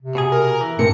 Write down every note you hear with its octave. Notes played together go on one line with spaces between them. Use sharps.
C3
B2 G#4
A#4
E3
G2 C3 C4 A#4 C#7